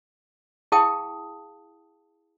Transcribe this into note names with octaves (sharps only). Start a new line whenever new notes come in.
E4 G#4 F5 G5 A5 D#6